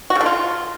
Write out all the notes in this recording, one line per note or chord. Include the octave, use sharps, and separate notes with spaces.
F#4
C#3
D3
F4